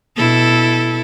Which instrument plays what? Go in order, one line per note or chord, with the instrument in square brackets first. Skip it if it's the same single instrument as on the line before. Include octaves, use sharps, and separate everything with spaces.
[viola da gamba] B2 E4 A4